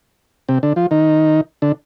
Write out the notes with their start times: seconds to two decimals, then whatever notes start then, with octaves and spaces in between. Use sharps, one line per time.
0.49 C3 C4
0.63 D3 D4
0.76 F3 F4
0.91 D#3 D#4
1.62 D3 D4